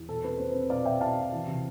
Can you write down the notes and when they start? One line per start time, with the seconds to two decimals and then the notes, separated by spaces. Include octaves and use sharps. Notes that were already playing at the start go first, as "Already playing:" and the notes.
Already playing: E2
0.09 B2 A4
0.24 C4 B4
0.38 C4 C5
0.51 C4 B4
0.70 B2 D5 F5
0.85 B2 E5 G5
1.01 B2 F5 A5
1.17 B2
1.32 E3
1.47 C3